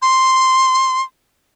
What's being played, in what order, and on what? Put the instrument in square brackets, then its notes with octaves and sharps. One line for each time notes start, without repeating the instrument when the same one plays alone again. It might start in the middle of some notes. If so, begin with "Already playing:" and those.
[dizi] C6